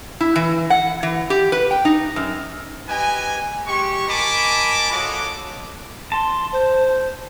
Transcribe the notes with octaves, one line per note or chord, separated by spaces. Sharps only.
E4
E3
F#5
E3
G4
B4
G5
D#4
F#2
G4 B4 D#5 G#5
G#3 G4 C#6
A#4 D#5 G#5 A5 B5 D6
F4 F#4 A4 C#5 D#5 D6
A5 C6
C5